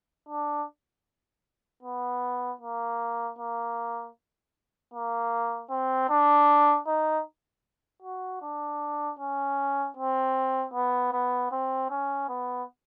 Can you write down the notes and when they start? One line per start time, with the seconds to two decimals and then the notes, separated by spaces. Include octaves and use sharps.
0.29 D4
1.83 B3
2.61 A#3
3.39 A#3
4.94 A#3
5.70 C4
6.10 D4
6.87 D#4
8.02 F#4
8.42 D4
9.19 C#4
9.97 C4
10.74 B3
11.12 B3
11.52 C4
11.90 C#4
12.29 B3